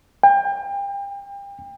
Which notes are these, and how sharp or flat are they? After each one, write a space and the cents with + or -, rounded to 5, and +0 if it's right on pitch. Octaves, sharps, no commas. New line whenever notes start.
G5 +35